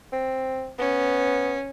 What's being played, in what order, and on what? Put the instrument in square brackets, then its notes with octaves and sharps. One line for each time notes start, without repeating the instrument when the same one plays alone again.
[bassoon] C4
[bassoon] B3 [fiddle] C#4